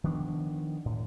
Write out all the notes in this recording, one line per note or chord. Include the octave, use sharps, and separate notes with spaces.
D#3 F3 B3 D4
A2